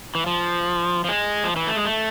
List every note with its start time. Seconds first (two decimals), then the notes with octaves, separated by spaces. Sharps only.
0.15 E3
0.26 F3
1.05 F3
1.09 G#3
1.44 F3
1.56 E3
1.67 A3
1.76 G#3
1.85 A3